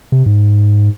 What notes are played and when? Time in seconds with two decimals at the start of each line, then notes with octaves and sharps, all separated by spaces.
0.12 C3
0.26 G#2